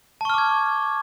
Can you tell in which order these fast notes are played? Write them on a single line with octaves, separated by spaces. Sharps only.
A5 C#6 F6 D6 G#6